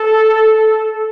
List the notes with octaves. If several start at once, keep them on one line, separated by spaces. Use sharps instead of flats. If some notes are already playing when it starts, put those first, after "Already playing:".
Already playing: A4